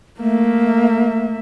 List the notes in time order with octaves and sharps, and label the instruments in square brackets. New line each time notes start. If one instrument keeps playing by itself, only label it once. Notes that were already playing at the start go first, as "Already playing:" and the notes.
[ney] A3 [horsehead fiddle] A#3 E5